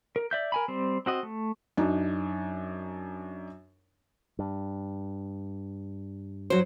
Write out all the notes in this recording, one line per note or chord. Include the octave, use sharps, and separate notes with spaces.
A#4
D5 E5 G6
A#4 G#5 B5
G3 C4
C4 F#4 D#5
A3
F#2 D4 D#4
G2
F#3 C5